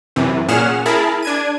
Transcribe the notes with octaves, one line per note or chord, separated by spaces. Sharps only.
F#2 C3 E3
A#2 C#4 G#4 F#5 F6 E7
E4 G#4 A#4 A5 B5
D4 G#6 D#7